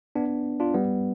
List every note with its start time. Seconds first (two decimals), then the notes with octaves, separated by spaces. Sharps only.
0.15 B3 D4
0.60 D4 F4
0.74 G3 B3